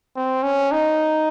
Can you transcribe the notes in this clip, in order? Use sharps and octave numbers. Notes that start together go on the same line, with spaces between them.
C4
C#4
D#4